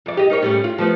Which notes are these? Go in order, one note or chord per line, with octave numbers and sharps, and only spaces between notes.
F2 D5
G4 D#5
D#4 A#4 C#5
A2 G3 C#4
F4
F3 A3 B3